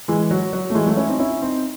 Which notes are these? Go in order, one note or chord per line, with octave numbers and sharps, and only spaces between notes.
E3 G#3
F#3
F#3
A3
E3 G#3
F#3 A3
C#4 E4
C4 D#4
C#4 E4
C4 D#4